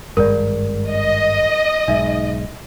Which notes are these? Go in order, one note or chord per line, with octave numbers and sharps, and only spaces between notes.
G#1 G2 G#3 A#4 D5
D#5
B1 G#2 D#4 E5